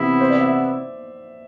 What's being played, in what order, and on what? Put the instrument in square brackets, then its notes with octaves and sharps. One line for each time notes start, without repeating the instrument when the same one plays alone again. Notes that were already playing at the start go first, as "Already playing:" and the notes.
Already playing: [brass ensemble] C3 E3 B3 E4
[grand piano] C5
D5
E5